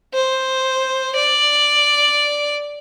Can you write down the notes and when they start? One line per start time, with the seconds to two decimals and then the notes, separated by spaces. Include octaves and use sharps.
0.14 C5
1.16 D5